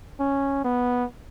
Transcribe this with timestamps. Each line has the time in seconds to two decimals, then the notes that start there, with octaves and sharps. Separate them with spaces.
0.20 C#4
0.64 B3